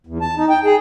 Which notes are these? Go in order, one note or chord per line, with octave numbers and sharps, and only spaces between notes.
E2
A5
D#4
G5
G#4